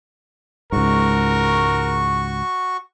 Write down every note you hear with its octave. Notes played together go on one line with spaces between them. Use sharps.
C#2 G#2 F#4 A#4 C#6